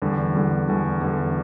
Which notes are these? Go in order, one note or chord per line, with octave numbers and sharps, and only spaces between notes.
E2 D3 G3
E2 D3 G3
E2 D3 G3
E2 D3 G3